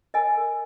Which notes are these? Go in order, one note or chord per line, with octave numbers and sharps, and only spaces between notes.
A#4 D#5 G#5
A#4